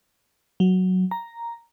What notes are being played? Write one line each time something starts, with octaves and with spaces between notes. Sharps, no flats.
F#3
A#5